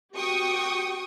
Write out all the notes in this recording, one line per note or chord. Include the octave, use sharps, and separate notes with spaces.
F#4 G4 G5 C#6 D#6